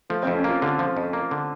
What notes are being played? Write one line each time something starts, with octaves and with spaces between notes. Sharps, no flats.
F3 A3
F2 C4
C#4
A#3 F4
D3 F4
F3
F2
A#3
D3